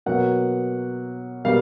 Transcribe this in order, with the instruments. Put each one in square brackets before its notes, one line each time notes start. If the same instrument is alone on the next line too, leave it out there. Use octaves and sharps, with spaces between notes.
[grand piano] B2 F#3 A#3 F#5
B2 G3 A#3 F5